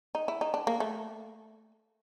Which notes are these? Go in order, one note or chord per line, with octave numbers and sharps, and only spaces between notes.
D#4
E4
D#4
D4
A#3
A3